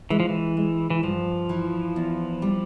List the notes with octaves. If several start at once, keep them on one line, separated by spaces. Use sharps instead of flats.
E3 G#3
F3
E3
G#3
E3
G2 F3
E3
E2
G3